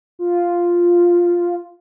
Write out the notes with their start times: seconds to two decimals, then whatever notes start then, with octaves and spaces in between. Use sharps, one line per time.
0.19 F4